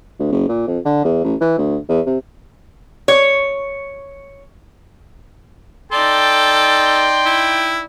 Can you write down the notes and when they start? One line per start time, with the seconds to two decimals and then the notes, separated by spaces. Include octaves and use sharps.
0.19 D2
0.32 F#1
0.49 A#2
0.67 F2
0.85 D3
1.04 E2
1.24 A1
1.41 E3
1.58 D2
1.89 E2
2.06 C3
3.08 C#5
5.92 D#4 A4 D5 G5 C6
7.26 E4